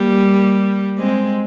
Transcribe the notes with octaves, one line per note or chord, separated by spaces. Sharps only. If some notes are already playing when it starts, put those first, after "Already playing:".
Already playing: G3 A#3
G#3 C4